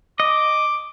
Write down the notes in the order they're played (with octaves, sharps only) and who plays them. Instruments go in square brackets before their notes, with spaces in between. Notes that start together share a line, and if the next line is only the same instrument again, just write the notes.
[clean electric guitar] D#5 [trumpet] D6